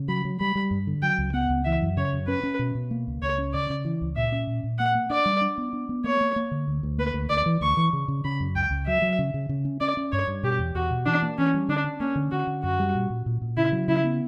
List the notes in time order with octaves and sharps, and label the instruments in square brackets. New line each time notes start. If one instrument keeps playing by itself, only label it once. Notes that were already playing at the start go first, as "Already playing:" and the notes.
Already playing: [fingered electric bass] C#3
[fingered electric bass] F#3 [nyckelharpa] B5
[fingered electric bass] F#3
[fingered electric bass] G3 [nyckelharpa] B5
[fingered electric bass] G3
G2
D3
[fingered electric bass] F#3 [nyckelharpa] G5
[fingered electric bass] C#2
[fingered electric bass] B3 [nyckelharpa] F#5
[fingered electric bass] C#2
[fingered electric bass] E3 [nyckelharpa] E5
[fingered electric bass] F#2
[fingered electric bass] C#3 [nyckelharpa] C#5
[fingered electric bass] F#2
[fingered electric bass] C#4 [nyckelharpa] B4
[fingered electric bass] C#4
B2
B2
A#3
C#2
[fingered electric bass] C#2 [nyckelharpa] C#5
[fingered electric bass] C#4
[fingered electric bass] C#3 [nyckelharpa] D5
[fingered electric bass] C#3
E3
C#2
[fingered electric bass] A#2 [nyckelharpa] E5
[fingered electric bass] C#4
A#2
A#2
[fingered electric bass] A#3 [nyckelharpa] F#5
[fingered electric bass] A#3
[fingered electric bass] D4 [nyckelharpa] D5
[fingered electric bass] G3
D4
B3
D4
B3
[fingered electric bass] A#3 [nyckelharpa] C#5
[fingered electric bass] A#3
A#3
D3
D2
D2
[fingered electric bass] A#3 [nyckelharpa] B4
[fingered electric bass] D2
[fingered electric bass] D2 [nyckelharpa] D5
[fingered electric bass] E3
[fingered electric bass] D2 [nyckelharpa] C#6
[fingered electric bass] E3
C#3
C#3
[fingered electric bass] C#3 [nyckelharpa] B5
[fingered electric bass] F#2
[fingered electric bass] C#2 [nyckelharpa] G5
[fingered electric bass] C#2
[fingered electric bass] F#3 [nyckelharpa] E5
[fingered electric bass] F#3
C#3
C#3
C#3
C#4
[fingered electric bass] C#4 [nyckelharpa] D5
[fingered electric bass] C#4
[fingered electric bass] G2 [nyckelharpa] C#5
[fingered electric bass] G2
[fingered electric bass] B2 [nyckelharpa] G4
[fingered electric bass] E2
[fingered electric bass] E2 [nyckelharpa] F#4
[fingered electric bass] B2
[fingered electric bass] E3 [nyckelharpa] D4
[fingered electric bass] A#3
[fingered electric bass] E3 [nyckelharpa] C#4
[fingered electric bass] G3
[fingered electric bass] D3 [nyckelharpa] D4
[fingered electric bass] C#4
[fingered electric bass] A#3 [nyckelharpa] C#4
[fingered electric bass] D3
[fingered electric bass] D3 [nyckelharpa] F#4
[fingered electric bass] D3
[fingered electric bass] F#2 [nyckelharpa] F#4
[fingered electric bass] G3
A#2
A#2
A#2
A#2
[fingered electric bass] C#3 [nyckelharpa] E4
[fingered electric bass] F#3
[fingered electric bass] C#3 [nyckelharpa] E4
[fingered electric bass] B3